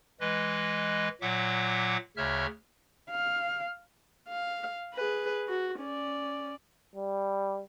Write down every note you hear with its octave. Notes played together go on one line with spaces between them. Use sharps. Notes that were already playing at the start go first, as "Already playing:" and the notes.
E3 G#3 B4 D#5
A#2 F#3 E5 F#5 D6
D2 C#3 C#5 E5 F6
F5
F5
G#4 B4
F#4
C#4 D5
G3